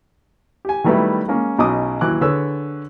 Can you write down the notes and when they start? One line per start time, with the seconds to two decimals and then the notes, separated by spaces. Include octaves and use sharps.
0.65 G4 G#5
0.84 D#3 F#3 G3 A3 B3 E4
1.28 G#3 A#3 C#4
1.58 B1 B2 C#4 D#5 D6 D#6
2.01 D#2 E3 F#3 D6 F#6
2.21 D3 G#4 B4 C#5 E6